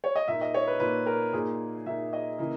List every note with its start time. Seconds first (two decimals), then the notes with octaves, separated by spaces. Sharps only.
0.04 C#5
0.16 D#5
0.28 A#2 A#3 D#4 E5
0.41 D#5
0.54 C#5
0.67 B4
0.80 A#2 A#3 D#4 B4
1.06 A#4
1.33 A#2 A#3 D#4 G#4
1.86 A#2 A#3 D#4 E5
2.13 D#5
2.39 C#3 E3 A#3 E4